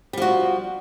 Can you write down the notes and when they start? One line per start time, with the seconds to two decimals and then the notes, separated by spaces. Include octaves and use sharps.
0.13 G3
0.17 F3
0.22 F#4